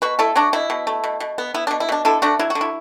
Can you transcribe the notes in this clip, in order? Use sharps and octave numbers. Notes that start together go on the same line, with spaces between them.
B2 F#4 B4
A3 E4 A4
F#3 D4 F#4
B2 E4
B2
A3
B2
B2
B3
B3 E4
B2 D4
E4
B2 D4
D3 E4 A4
A3 D4 F#4
F#3 E4
F#4
D3
E4